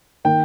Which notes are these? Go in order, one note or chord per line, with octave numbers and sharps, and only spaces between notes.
D#3 A#3 G5